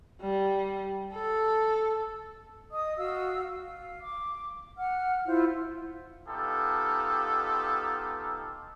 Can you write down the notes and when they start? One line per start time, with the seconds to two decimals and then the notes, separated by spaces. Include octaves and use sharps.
0.21 G3
1.13 A4
2.70 D#5 D#6
2.97 F#4 F5 E6
3.59 F5
4.01 D6
4.76 F#5 F6
5.25 E4 F4 C5 F5
6.29 B3 D#4 F4 G4 A4